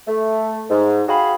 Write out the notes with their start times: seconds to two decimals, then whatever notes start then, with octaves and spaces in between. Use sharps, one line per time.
0.07 A3
0.70 G#2
1.08 F#4 G#4 F5 G5 G#5 B5